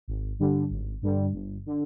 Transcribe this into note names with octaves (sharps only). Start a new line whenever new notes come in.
G#1
G2 D3 G3
G#1
G2 D3 G3
G1
D3